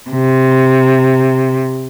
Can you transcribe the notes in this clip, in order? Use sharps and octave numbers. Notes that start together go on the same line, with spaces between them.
C3